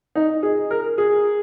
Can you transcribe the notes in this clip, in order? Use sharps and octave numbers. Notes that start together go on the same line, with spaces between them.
D#4
G#4
A#4
G#4